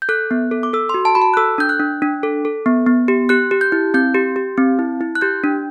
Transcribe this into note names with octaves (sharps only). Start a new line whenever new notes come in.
G6
A4 F#6
B3
A4
D6
A4 E6
F#4 C6
A5
F#4 B5
A5
F#6
A4 E6
D4 G6
F#6
D4
D4
A4
A4
B3
B3
G4
G4 F#6
G4
G6
E4
C4 G6
G4
G4
C4
E4
E4
F#6
G4 G6
D4